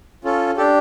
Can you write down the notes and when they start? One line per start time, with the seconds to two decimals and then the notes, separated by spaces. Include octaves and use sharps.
0.24 C#4 F4 A4
0.57 D4 G4 A4